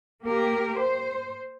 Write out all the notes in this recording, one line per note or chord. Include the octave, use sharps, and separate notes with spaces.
A#3 G4 A#4
C5